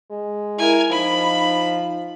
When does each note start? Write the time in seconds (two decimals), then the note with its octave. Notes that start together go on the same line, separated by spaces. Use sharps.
0.11 G#3
0.58 E4 A#4 G#5
0.91 F3 D#4 B5